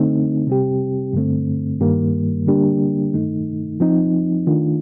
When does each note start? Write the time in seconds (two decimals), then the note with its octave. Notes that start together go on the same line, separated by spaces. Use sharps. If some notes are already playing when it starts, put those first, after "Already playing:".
Already playing: D3 A3 C4 D#4
0.47 C3 G3 C4 G4
1.13 G2 D3 A3 C4
1.80 G2 D#3 G3 A#3
2.47 D3 G3 A#3 D4 G4
3.14 G2 D#3 A3 D#4
3.80 F3 C4 D#4
4.47 D#3 A3 D4 F4